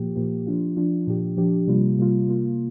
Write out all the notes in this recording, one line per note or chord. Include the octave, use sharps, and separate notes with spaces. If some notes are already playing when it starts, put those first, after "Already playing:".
Already playing: A#2 F3 A#3 G4
A#2 F3 A#3 G4
F3 D4 F4
F3 D4 F4
A#2 F3 D4 G4
A#2 F3 D4 G4
C3 G3 A#3 F4
C3 G3 A#3 F4
C3 A#3 F4